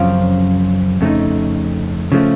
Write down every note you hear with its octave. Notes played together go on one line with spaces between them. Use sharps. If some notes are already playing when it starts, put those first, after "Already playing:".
Already playing: F#2 C#3 F3 C4 F4
F2 C#3 A3 D#4
C#3 F3 A3